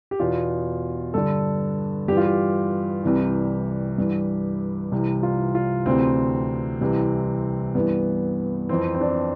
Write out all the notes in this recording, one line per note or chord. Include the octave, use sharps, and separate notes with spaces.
G4
E2 B2 F4
G2 D3 A4
G2 E3 G4
F4
G4
C2 C3 E3
G2 E3
C2 C3 E3
F4
F4
D2 C3 E3 C4
C2 C3 E3
G2 E3 B3
F2 E3 C4
C4
D4